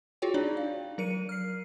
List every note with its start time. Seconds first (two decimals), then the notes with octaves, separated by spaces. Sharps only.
0.22 F4 F#4 G#4 C#5 G5
0.34 D4 D#4 D5
0.57 F5
0.98 F#3 A#4 C#7 D#7
1.29 F6 C7